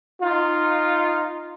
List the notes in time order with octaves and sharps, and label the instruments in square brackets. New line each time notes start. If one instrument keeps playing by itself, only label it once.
[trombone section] D#4 F4